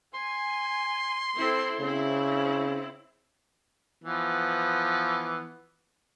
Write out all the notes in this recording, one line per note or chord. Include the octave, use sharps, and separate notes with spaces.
G#5 C6
C4 E4 A4
C#3 C4 E4
E3 F3 B3